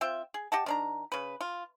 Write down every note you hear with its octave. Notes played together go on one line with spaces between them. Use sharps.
C4 F4 E5 G5
G#4
G4 D#5 F#5 A5
D#3 D4 A#5
C#3 B4
F4